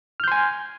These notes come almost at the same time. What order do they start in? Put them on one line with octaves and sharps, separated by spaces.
F6 G6 C6 G#5